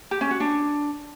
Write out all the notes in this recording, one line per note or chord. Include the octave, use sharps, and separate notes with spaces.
G4
C#4
F#4
D4